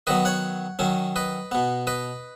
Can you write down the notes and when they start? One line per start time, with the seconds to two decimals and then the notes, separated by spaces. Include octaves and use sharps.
0.07 D#3 F#3 B3 B4 D#5
0.25 C#5 F#5
0.79 D#3 F#3 C#4
1.16 B4 D#5
1.52 B2 B3
1.87 B4 D#5